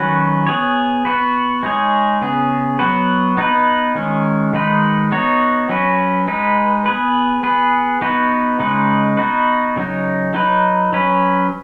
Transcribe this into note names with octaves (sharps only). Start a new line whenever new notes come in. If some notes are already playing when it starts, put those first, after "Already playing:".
Already playing: D#3 F#3 C#4 F#4 B4
B3 G#4 C#5
B3 F#4 B4
G#3 D#4 G#4 C#5
C#3 B3 G#4
F#3 B3 F#4 B4
B3 D#4 B4
D#3 G#3 C#4
D#3 G#3 D#4 B4
B3 D#4 F#4 C#5
F#3 C#4 F#4 B4
G#3 D#4 B4
B3 G#4 B4
B3 G#4 B4
B3 D#4 F#4 B4
C#3 G#3 D#4 B4
B3 D#4 F#4 B4
C#3 F#3 D#4
F#3 D#4 B4
F#3 C#4 B4